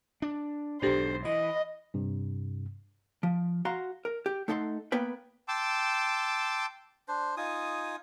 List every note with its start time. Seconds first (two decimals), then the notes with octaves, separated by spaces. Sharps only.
0.22 D4
0.82 B1 G#2 D4 G4 A4 C5
1.25 E3 D#5 B5
1.94 G2 C3
3.23 F3
3.65 F#4 F5 A#5 C6
4.05 A#4
4.26 G4
4.48 A3 D#4 A4 F#5 C6
4.92 A#3 B3 B4 G5
5.48 G5 A5 C6 D6 E6
7.08 D4 C5
7.37 D#4 F4 G#5 D#6